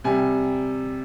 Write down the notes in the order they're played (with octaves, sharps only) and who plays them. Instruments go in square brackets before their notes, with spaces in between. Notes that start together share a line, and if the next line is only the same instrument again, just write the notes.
[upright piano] C3 G3 G#5